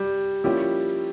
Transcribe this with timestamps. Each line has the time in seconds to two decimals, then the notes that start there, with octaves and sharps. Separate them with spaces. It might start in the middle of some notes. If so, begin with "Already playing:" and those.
Already playing: G3
0.44 F3 G3 A#3 C#4 E4 G4